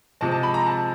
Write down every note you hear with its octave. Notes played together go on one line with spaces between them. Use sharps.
C3 F3 G#3 A5
A5
B5
A#5
A5